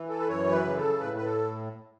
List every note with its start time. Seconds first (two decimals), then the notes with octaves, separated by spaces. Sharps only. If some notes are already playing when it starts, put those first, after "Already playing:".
Already playing: E3
0.09 A4
0.20 B4
0.28 F#2 C#5
0.52 B4
0.64 C#3
0.76 A4
1.00 A2 B4
1.17 B4
1.24 A4